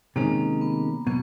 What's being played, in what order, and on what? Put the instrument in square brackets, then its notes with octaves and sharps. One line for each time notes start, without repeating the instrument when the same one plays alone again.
[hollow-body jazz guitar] C3 D#3 G#3 C#4 [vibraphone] A#3
[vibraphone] B3
[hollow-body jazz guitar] B2 F#3 [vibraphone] B3